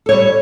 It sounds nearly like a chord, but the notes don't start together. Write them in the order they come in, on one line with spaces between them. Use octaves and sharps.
A4 C#5 G3